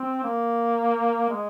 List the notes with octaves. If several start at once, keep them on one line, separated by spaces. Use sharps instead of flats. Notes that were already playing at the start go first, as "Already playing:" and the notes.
Already playing: C4
A#3
G#3